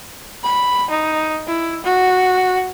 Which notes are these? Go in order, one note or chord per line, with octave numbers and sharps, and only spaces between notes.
B5
D#4
E4
F#4